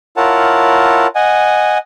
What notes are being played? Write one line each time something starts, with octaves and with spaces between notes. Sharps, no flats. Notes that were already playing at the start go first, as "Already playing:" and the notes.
E4 F4 A#4 C#5 F#5 A5
D#5 F#5 G#5